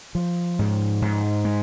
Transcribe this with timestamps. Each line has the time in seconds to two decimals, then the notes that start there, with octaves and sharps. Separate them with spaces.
0.15 F3
0.59 G#2
1.02 G#2
1.45 G#3